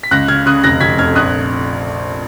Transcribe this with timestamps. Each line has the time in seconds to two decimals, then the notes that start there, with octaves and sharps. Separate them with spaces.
0.03 B6
0.11 C#2 F#6 A#6
0.28 C#3 F6 G#6
0.46 C#3 D#6 F#6
0.64 F1 F#6 A#6
0.80 F1 G#6 B6
0.98 F2 F6 G#6
1.15 A#1 D#6 F#6